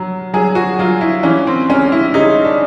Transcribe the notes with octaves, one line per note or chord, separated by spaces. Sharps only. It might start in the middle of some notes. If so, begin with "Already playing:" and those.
Already playing: F#3
F#3 G#4
F#4
F#3 F4
E4
E3 C#4
C4
C#2 C#4
E4
C#3 D#4
D4